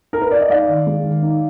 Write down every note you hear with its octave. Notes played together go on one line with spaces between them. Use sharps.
A#4
B4
D5
D#5
D#4 D5 F5
D#3
G#3
D#3
D#4